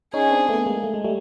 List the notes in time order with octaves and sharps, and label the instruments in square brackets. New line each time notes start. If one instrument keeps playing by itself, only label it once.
[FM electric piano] C#4 D#4 [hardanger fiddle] G#4
[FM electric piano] C4 D4
A3 B3
G#3 A#3
A3
G#3
G3 A3